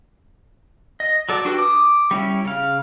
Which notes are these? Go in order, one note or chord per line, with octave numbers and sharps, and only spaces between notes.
D#5
F#3 A4 D5
D4 F#4 G4 A4 B4
D6 D#6
G3 C#4 E4
C#3 F5